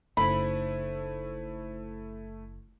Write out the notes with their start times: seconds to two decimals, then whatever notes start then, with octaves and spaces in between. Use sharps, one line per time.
0.17 F#1 A3 C#4 D#4 E4 C5 B5